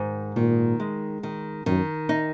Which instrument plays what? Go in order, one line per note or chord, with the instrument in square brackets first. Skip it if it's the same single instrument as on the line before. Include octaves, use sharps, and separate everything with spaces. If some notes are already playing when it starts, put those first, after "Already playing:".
Already playing: [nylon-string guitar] G#2 D#3
[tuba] A#2 [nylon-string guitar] D#3
[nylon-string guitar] G#3
D#3
[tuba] F#2 [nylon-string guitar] D#3
[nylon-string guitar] D#4